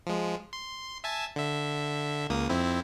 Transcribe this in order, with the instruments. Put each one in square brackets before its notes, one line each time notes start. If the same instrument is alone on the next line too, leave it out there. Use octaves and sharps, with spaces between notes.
[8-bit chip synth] F3 G#3
C6
E5 G#5 A5
D3 E5
C#2 A#3 D#6
F2 C4 E4